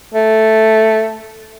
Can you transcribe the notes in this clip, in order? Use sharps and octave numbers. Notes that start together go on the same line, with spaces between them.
A3